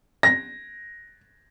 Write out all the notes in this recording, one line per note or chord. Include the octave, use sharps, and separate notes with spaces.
A#6